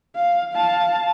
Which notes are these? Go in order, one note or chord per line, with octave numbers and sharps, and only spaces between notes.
F5
F5 A5